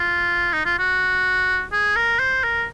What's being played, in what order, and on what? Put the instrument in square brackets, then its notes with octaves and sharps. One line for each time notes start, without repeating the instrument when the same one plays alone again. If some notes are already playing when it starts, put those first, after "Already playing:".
Already playing: [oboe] F4
D#4
F4
F#4
G#4
A#4
C5
A#4